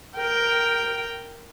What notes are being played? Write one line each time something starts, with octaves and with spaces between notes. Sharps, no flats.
A#4 G5